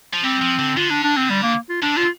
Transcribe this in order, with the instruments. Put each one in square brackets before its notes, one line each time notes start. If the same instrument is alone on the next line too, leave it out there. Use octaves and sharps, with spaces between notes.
[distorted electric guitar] F3
[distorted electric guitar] G3 [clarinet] C4
[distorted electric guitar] F3
D3
[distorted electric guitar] D3 [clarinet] F4
[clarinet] D4
D4
C4
G3
A#3
F4
[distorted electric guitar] D3 [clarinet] D4
[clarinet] F4